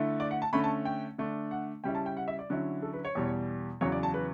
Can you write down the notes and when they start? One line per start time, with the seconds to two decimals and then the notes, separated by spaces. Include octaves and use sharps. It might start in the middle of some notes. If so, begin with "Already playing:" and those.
Already playing: D3 A3 E4
0.20 D5
0.31 F#5
0.42 A5
0.53 D3 A3 C#4 B5
0.64 A5
0.85 G5
1.18 D3 A3 D4
1.51 F#5
1.84 C#3 G3 C#4 E4 G5
1.95 A5
2.06 G5
2.17 F#5
2.28 E5
2.39 D5
2.50 D3 F#3 C#4 E4
2.82 A4
2.93 B4
3.05 C#5
3.15 E2 B2 G3
3.81 E2 C#3 F#3 C#5
3.92 D5
4.03 A5
4.14 B4